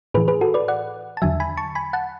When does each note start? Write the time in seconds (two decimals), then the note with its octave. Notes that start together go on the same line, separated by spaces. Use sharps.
0.14 A2 E3 G#4 B4
0.28 G#4 B4
0.41 F#4 A4
0.54 B4 D5
0.68 D5 F#5
1.17 A5
1.22 E2 D3 F#3 E5 G#5
1.40 G#5 B5
1.57 A5 C#6
1.75 G#5 B5
1.93 F#5 A5